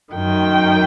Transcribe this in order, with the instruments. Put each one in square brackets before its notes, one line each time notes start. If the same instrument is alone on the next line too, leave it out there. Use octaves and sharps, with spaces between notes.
[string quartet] F#2 D#3 G5